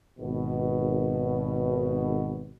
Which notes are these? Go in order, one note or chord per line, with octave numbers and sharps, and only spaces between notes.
G#1 B2